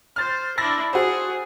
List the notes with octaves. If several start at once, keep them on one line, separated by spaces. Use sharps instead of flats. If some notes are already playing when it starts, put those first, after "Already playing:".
C5 F6 A6
D4 E4 E6 A6 A#6
F#4 G#4 C5